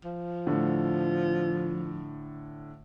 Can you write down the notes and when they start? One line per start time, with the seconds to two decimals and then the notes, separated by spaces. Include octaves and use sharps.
0.05 F3
0.46 A2 D3